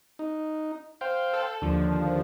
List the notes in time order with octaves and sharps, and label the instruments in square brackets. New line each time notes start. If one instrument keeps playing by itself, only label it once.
[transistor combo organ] D#4
C5 F5 G5
[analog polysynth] A4
[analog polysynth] D#2 F3 [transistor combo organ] D3